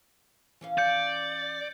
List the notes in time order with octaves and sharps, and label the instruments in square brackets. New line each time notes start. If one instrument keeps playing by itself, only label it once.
[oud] E3 C#4 F5
[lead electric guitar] D5 [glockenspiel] G6 C#7